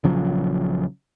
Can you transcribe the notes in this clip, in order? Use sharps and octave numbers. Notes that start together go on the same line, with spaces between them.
A#1 C#3 F3 F#3